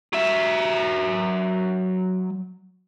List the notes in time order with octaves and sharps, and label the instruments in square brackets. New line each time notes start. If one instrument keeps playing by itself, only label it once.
[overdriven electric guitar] F#3 E5